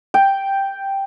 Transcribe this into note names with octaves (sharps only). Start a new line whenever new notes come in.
G5